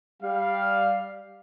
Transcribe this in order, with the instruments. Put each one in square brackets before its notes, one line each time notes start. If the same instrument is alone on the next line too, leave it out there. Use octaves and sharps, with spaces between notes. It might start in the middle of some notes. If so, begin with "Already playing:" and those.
[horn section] G3 F5